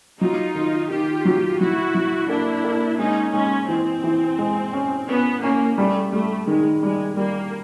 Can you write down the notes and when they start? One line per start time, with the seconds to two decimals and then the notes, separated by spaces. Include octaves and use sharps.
0.20 F#3 D#4 F4
0.55 D#3
0.90 D#3 F4 G4
1.25 F#3
1.60 F#3 E4 F#4
1.95 F#3
2.29 A#3 D4 E4
2.64 A#3
2.99 G#3 C#4 D#4
3.34 G#3 C#4
3.68 E3 C4
4.04 E3
4.38 G#3
4.73 C#4
5.09 B3 C#4
5.43 A#3 C#4
5.78 G3 A3
6.13 G3 A3
6.47 D#3 G#3
6.82 G3 G#3
7.17 G3 A#3